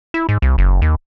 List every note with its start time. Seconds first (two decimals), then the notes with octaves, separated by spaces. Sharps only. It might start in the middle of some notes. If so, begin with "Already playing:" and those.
0.14 E4
0.29 G#2
0.42 C2
0.58 F#1
0.82 D#2